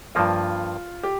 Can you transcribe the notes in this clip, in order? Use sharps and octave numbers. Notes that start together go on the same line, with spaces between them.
G2 F3 A#3 F4
G4